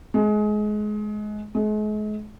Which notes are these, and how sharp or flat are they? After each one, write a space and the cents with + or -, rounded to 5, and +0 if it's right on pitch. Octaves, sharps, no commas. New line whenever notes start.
G#3 +25
G#3 +40